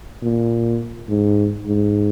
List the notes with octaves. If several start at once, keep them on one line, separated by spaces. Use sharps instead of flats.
A#2
G#2
G#2